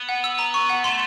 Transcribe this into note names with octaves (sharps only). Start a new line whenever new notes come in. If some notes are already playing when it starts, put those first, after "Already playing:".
Already playing: B3
F#5
E6
A#5
C#6
F#5
A3 C6